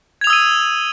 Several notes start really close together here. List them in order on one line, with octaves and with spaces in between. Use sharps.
G#6 F7 D#6 E6 D#7